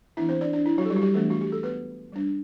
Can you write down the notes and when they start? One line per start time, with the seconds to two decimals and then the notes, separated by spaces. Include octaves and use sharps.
0.17 E3 B3 D4 E4 E5
0.29 C4 C5
0.41 D4 D5
0.53 D4 D5
0.66 E4
0.78 F#3 F#4
0.85 A4
0.90 G3 G4
0.96 F#4
1.02 G3 G4
1.14 E3 A3 B3 D4 A4
1.30 F#4
1.41 G4
1.52 A4
1.63 B3 B4
2.12 G3 D4